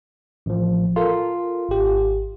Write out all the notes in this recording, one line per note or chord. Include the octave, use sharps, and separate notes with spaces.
A1 F3
F4 A4 A#4
G#1 G4